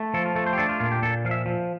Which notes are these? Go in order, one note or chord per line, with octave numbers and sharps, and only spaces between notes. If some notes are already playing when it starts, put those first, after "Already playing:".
Already playing: A3
F3 A4
F4
A3 A4
C5
G4
D4 A4
F4
A#2 F4
G4
A#2 A4
F3 F5
E5
F3